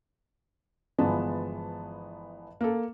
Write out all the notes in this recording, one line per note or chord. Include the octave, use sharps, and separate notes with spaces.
G1 E3 F3 G#3 B3 A5
A#3 A4